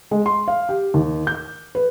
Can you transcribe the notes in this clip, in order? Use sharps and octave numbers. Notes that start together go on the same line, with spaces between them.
G#3
C6
F5
G4
D#2
G6
B4